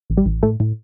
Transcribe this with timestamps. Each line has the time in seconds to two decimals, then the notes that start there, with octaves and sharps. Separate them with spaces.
0.10 A1
0.17 G3
0.26 A1
0.43 A2 A3
0.60 A2